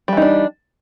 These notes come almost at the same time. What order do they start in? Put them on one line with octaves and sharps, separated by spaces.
G3 E3 D#4 D4